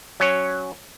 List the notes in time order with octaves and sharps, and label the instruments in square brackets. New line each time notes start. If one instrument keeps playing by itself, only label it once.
[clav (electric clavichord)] F#3 C#4 C#5